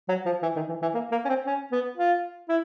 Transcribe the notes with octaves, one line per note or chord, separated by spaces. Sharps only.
F#3
F3
E3
D#3
E3
E3
A#3
A#3
C#4
C4
C#4
B3
F4
E4